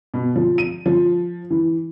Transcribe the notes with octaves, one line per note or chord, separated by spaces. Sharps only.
B2
F3
D#7
F3
E3